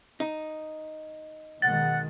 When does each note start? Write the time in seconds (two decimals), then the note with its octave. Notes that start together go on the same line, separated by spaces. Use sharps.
0.20 D#4
1.62 B1 D#3 G#3 F#5 A6